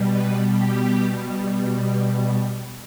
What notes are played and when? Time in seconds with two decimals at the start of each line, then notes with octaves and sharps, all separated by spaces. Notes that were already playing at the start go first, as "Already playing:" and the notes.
Already playing: B2 G3
0.13 B4
0.54 G4